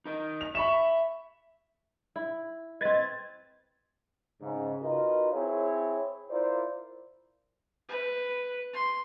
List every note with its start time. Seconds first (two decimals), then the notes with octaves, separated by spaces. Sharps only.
0.05 D#4 A#4
0.41 F7
0.55 E5 B5 C#6 E7
2.16 E4
2.81 C4 B4 D#5 G#6 A6
4.42 G#2 C#3
4.82 D#4 F4 F#4 A#4 B4 D#5
5.33 C4 E4 G#4 C#5
6.30 E4 F4 A#4 C5 D5
7.89 B4
8.73 C6